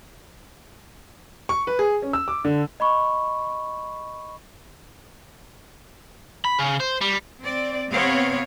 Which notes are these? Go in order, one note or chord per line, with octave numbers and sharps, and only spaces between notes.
C#6
B4
G#4
C#4
E6
D6
D3
D#5 B5 C#6
B5
C#3
C5
G3
C4 D5
C3 B3 C4 C#5 F5